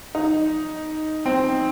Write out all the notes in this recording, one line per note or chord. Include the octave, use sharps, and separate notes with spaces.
D#4
C4